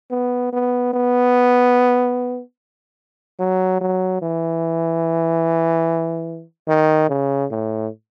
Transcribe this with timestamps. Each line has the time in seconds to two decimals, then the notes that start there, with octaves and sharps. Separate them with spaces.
0.11 B3
0.53 B3
0.93 B3
3.39 F#3
3.81 F#3
4.22 E3
6.68 D#3
7.09 C#3
7.51 A2